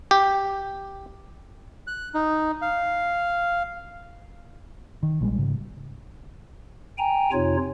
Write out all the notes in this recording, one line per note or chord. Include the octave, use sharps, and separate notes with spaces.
G4
F#6
D#4
F5
D#3
A#1 G3 G#3
G#2 C#3
G5 G#5 A#5
F2 C3 D#4 F4 C#5